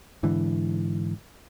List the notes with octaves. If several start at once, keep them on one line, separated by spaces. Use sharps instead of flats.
G#2 D3 E3